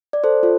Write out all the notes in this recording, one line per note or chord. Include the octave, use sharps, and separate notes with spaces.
D5
A4 C5
F4 A4